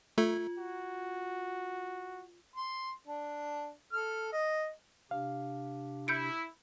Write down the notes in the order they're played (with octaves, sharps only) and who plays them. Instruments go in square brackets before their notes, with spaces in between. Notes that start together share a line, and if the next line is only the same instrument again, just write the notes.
[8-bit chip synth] A3 [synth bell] F4
[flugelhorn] F#4
[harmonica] C6
D4
A4 F6
D#5
[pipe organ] C3 D4 G4 [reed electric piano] F5
[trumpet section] E4 [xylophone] G6 C#7 D7